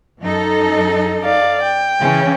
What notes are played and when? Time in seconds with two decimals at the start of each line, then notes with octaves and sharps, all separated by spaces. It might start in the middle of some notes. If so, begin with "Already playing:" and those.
0.21 F#2 D#4 A4
1.24 D5 F5
1.62 G5
2.00 C#3 E3 C#4